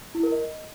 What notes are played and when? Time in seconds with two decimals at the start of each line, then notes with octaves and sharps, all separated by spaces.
0.15 E4
0.23 A#4
0.32 D#5